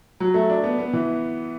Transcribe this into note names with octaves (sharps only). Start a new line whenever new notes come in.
F#3
A3
D4
B3
B3
E3